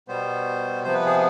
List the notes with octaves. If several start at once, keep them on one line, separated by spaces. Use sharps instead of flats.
B2 G3 B3 C5
C3 F3 B3 C5
B4
G#4